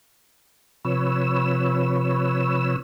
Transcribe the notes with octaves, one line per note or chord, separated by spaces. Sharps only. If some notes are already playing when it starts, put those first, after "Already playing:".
C3 F3 B4 C#5 E6